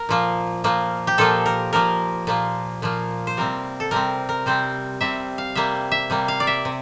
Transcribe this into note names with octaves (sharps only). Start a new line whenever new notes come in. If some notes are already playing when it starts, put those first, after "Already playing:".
Already playing: A#4
A#2 F3 A#3
A#2 F3 A#3
G4
A#2 F3 A#3 A4
A#4
A#2 F3 A#3 A#4
A#2 F3 A#3
A#2 F3 A#3
C5
C3 G3 C4 A#4
A4
C3 G3 C4 A#4
A#4
C3 G3 C4 C5
C3 G3 C4 E5
F5
C3 G3 A#3 E5
E5
C3 G3 A#3
F5
D5
E5
C3